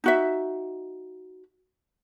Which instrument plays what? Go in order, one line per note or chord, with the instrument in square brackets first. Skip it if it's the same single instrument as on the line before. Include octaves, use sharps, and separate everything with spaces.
[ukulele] D#4 F#4 E5